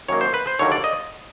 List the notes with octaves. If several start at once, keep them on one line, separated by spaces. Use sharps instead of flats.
F#2 D#3 F#3 A#3 C#5
C5
B4
C5
D#2 D3 F#3 A#3 C#5
D5
D#5